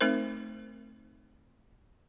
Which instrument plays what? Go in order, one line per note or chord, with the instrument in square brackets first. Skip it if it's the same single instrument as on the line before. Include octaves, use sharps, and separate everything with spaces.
[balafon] A3 C4 D#4 A#4 C5